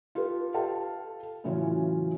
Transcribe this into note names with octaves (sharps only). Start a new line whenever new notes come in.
F4 G4 A4 B4
A4 F5 G5 A5
A2 C#3 E3 F#3 C#4 F4